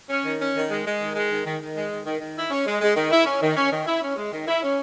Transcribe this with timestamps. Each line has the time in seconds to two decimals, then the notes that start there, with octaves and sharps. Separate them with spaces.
0.10 C#4
0.25 D#3
0.39 C#4
0.55 D#3
0.69 G#3
0.85 G#3
1.00 D#3
1.15 G#3
1.30 D#3
1.45 D#3
1.59 D#3
1.75 G#3
1.90 D#3
2.05 D#3
2.20 D#3
2.35 E4
2.50 C#4
2.65 G#3
2.80 G#3
2.95 D#3
3.11 E4
3.25 C#4
3.41 D#3
3.56 C#4
3.71 D#3
3.86 E4
4.02 C#4
4.16 G#3
4.32 D#3
4.46 E4
4.62 C#4